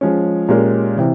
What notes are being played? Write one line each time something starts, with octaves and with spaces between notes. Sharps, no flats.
F3 G#3 C#4
A#2 G#3 C#4 G4 A#4
C3 E3